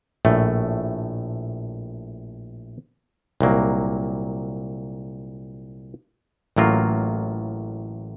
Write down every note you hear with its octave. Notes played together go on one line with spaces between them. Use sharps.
A#1 A2 A3
C2 A#2 F#3 A#3
A1 A2 F#3 A#3 F4